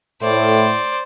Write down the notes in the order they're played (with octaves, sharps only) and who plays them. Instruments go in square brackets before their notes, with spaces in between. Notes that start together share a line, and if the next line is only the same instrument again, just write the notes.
[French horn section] A2 [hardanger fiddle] C5 D5